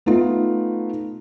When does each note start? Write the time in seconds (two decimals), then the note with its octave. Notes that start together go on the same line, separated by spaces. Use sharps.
0.06 A3 B3 D#4 F4